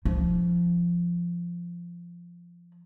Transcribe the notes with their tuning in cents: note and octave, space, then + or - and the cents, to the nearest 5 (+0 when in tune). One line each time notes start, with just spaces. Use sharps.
F3 -10 D#4 +40